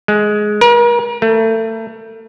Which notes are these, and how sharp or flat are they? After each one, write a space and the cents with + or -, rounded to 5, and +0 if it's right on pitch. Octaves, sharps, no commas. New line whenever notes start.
G#3 +10
A#4 +40
A3 +30